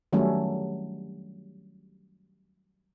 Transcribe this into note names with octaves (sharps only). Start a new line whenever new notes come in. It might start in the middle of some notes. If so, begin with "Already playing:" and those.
D#3 F#3 G3 A3 C#4